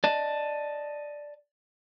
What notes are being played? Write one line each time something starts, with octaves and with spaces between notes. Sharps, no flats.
D5 D#5 A5